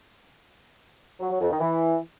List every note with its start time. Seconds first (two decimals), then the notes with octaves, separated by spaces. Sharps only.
1.20 F#3
1.30 F#3
1.40 F2
1.50 D#3
1.61 E3